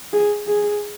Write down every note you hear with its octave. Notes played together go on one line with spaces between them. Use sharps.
G#4
G#4